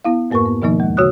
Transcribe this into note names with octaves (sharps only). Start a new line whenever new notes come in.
B3 E4 F5
F2 G#2 A#3 A#4 B4 C#6
B3
B2 D#3 F3 A#3 D#4
D#2 G#3
C#3 F#4 C#5 D#6 F#6